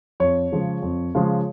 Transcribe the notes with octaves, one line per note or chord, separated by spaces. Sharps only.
F2 C#5
C#3 F3 G#3
F2
C#3 F3 G#3